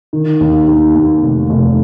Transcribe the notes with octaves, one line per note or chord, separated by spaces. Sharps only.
D#3
D#2
D#2
D#2
F1
F1